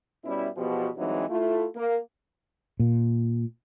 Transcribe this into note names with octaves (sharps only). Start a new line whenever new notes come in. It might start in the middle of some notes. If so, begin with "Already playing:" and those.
B2 G3 C#4 E4
E2 B2 F3 B3 F#4 G4
G2 E3 F#3 G#3 C4 D#4
A3 E4 F4
A#3
A#2